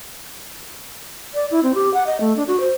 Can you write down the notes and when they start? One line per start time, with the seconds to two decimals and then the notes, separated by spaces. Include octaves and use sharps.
1.34 D5
1.51 E4
1.63 C4
1.75 G4
1.94 F#5
2.07 D#5
2.21 A3
2.36 D4
2.48 F#4
2.60 C5